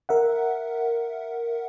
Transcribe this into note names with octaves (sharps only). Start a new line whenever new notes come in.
A#4 E5 F#5